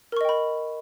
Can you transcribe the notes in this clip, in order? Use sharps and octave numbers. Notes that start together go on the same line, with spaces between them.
A#4 D#5 G5 B5 C#6